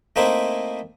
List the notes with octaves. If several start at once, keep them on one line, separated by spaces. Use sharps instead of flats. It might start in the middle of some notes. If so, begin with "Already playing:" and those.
A3 A#3 C4 D#4 E4 C5